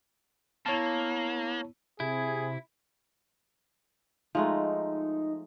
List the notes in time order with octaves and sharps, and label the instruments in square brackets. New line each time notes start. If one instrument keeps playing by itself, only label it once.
[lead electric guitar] A#3 [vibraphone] B3 E4 [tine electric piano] C#5 A5
[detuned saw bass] C3 [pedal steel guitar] E4 [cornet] G#4
[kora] F3 G#3 A3 [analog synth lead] D#4